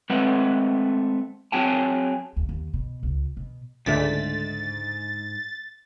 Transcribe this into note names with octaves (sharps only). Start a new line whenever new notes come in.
G#3 A3 C4 B4 F#5
F#3 C4 G#4 G5 A5
D#2
D#2
B2
C#2
B2
C#2 G#2 D3 G#3 A3 A6 B6